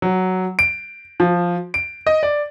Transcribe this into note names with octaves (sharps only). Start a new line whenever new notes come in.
F#3
D7
F3
D7
D#5
D5